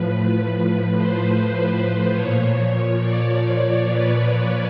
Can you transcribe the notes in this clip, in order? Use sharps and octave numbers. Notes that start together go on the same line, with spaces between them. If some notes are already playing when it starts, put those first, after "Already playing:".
Already playing: A2 F3 B4
C5
A#2 F3 C#5
C#5
C#5
D5
C#5
B4
B4